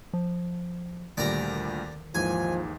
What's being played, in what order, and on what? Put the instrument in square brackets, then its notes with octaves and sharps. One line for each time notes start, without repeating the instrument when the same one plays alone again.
[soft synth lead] F3
[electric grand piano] D2 A#2 G3 [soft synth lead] D#3 [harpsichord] D5 A#5
[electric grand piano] D#2 G#2 E3 [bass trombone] F3 [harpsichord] G#5